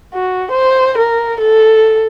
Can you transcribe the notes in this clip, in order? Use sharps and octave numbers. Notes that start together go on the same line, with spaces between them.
F#4
C5
A#4
A4